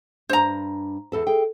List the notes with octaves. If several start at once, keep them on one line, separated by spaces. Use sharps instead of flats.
G2 D4 C5 A#5
E2 A4 A5
G#4 G5